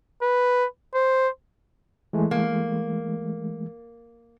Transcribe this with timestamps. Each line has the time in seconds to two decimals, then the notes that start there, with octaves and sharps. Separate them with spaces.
0.22 B4
0.94 C5
2.13 E3 G#3 A3
2.31 A#3